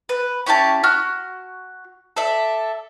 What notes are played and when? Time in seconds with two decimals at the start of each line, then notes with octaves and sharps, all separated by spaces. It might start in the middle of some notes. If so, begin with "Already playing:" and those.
0.09 B4
0.46 C#4 E4 G4 A5
0.84 F#4 F6
2.16 A4 D5 E5